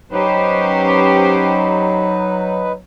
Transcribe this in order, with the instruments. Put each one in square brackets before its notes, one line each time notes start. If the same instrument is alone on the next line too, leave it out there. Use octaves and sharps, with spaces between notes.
[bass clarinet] F#3 [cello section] C#4 G4 C5 [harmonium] D#4 B4